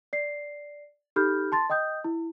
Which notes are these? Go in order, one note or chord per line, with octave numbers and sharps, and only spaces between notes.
D5 C7
D#4 G4 A4 B5 F6 G6
A5 C6 A6
D#5 G5 D#6 G6
E4